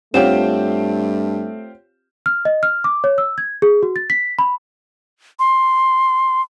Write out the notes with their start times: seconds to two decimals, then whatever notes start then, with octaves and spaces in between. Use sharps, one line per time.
0.14 G2 A3 C4 F4 G4 C#5 F#5 E7
2.26 F6
2.45 D#5
2.63 F6
2.84 D6
3.04 C#5
3.18 E6
3.38 G#6
3.62 G#4
3.83 F#4
3.96 A6
4.10 B6
4.39 B5
5.39 C6